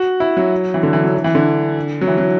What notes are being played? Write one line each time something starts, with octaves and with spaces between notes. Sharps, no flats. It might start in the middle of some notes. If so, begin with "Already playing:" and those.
Already playing: F#4
E4
F#3
E3
D3
E3
F#3
E3
E3
D3
F#3
E3
F#3